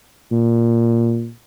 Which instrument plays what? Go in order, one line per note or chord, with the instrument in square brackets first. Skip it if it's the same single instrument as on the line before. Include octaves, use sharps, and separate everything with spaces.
[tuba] A#2